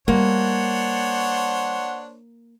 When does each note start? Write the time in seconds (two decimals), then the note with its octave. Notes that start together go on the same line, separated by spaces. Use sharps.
0.08 G3 A#3 D4 C5 C#5 F#5